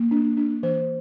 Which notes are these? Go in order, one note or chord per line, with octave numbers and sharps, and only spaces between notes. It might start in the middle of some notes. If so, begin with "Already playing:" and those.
Already playing: A#3
D4
D4
E3 C5